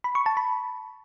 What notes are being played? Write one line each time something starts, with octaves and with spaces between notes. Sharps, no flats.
B5
C#6
A5
B5